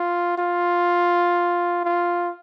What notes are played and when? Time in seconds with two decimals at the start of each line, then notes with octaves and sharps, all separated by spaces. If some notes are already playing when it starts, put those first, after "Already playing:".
Already playing: F4
0.38 F4
1.84 F4